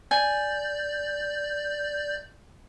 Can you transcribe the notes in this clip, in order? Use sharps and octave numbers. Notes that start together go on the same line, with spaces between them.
D5 G#5 G6